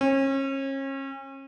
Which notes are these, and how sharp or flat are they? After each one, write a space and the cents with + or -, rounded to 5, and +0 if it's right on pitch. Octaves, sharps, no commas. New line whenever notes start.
C#4 -35